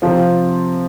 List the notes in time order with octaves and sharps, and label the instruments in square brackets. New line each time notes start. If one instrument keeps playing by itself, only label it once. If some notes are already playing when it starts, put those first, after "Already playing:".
[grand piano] C3 F3 C4 F4